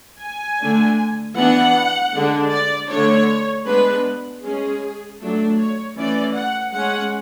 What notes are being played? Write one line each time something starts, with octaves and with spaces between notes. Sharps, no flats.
G#5
D3 A3 D4
E3 B3 D4 F#5
D3 G#3 D4
D5
D3 A3 D4 C#5
G#3 B3 D4 B4
G#3 C#4 G#4
F#3 A3 D4 A4
C#5
E3 A3 C#4 D5
F#5
G#3 C#4 F#5